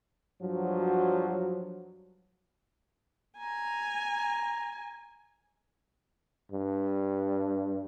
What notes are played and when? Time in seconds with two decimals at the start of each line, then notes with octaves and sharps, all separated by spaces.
0.42 G2 F3 F#3
3.38 G#5 A#5
6.52 G2